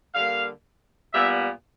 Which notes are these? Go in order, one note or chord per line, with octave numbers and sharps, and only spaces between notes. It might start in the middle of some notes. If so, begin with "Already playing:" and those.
D3 G3 A#3 F5
A#2 G3 B3 E5